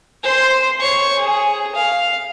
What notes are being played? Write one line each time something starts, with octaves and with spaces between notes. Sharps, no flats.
C5 C6
C#5 C#6
G#4
F5